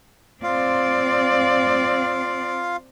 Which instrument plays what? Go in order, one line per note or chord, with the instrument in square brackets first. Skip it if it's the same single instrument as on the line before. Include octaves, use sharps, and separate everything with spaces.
[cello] C4 D5 [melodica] F4 F5